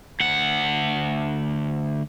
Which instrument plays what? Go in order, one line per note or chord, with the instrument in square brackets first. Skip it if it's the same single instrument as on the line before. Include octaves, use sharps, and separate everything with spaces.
[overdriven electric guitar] D2 F#5